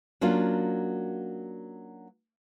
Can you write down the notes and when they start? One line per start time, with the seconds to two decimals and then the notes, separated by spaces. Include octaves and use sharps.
0.21 F#3 A#3 C#4 D4 F4